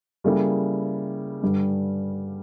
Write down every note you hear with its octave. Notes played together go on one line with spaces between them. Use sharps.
C#3 G3 A#3 E4 A4
G2 D3 G3